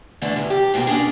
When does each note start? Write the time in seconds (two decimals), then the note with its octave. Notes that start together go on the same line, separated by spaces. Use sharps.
0.22 D3 E3 A3 D4
0.36 E2 A2
0.50 G4
0.74 G#2 B2 A#3 A#4 G5
0.87 A#3 C#4 D4 G#4